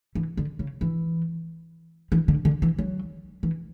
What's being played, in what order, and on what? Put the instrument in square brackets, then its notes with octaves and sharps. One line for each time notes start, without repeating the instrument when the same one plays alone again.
[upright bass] E3
D3
C#3
E3
E3
D3
D3
E3
F#3
E3